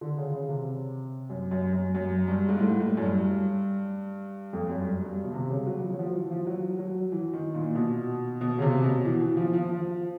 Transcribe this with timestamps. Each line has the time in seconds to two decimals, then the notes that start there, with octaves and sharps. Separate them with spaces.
0.01 D3
0.17 C#3
0.33 C#3
0.49 C3
1.30 F#2
1.51 F#2
1.73 F#2
1.95 F#2
2.27 G2
2.48 G#2
2.59 A2
2.80 A2
2.97 F#2
3.02 G2
4.53 F2
4.69 F#2
4.85 G2
5.01 G2
5.24 B2
5.34 C3
5.50 C#3
5.67 F#3
5.82 F3
5.94 F#3
5.99 F3
6.15 E3
6.31 F3
6.47 F#3
6.79 F#3
7.12 E3
7.33 D#3
7.54 A#2
7.75 B2
8.41 B2
8.58 C#3
8.62 C3
8.83 B2
9.05 E3
9.21 E3
9.37 F3
9.53 F3
9.69 F3